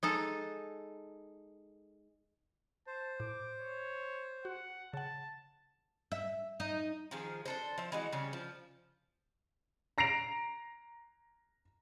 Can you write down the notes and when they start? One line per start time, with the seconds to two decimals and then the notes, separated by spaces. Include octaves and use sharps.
0.03 G#3 D#4 A4
2.87 C5 A5
3.20 A2 D6
3.60 C#5
4.45 F#4 F#5
4.93 C#3 F#5 A5
6.12 E5
6.60 D#4
7.11 D#3 F3 G#4
7.45 D4 A4 C5
7.78 F3 E5
7.92 E3 G#3 F#4
8.13 C#3 G3 C#4
8.33 F3
9.98 A#5 A#6 C7 D7 F7